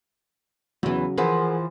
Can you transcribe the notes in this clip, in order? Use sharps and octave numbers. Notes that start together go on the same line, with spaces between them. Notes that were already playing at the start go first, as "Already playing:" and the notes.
E2 C#3 E3 F#3
E3 F3 G#4 A#4 F#5